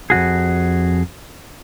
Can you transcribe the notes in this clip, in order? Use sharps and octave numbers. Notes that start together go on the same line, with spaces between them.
F2 C3 F#4 G#4